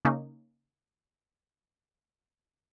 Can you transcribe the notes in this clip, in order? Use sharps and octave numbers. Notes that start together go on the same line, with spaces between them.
C#3 A#3 C#4 D#4